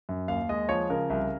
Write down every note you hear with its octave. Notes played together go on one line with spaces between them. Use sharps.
F#2
D#2 F5
G#3 D#5
F3 C#5
C#3 A#4
C2